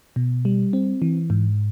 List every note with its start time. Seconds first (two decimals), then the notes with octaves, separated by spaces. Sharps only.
0.16 B2
0.45 G3
0.73 C4
1.02 E3
1.30 G#2